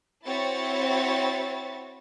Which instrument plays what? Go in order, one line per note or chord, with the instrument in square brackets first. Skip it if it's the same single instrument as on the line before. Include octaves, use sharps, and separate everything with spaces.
[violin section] C4 E4 F#4 C#5 A6